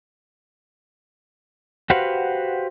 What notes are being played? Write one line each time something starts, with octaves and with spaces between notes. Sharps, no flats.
F#4 G4 B4 C5 F5 F#5